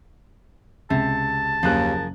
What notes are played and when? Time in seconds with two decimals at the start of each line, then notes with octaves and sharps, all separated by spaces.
0.90 C#2 C3 A5
1.63 F#1 D#2 F3 G#4 A#4 F#6